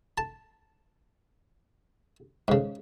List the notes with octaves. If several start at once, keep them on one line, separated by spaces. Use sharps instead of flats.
A5
G#2 C#3